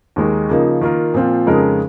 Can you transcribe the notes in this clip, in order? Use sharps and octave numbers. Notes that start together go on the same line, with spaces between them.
D#2 D#3 G#3 D#4
C#3 F3 A#3 D#4
D#3 A#3 F4 A#4
A#2 F3 C4 F4
F2 C#3 G#3 D#4 A#4